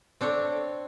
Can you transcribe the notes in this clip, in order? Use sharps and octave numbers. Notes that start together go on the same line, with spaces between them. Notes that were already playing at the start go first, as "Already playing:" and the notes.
C4 D4 A4 C#5